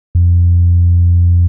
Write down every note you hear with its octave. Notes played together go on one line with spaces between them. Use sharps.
F2